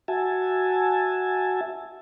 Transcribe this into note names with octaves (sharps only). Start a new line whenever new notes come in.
F#4 E5 G#5 A5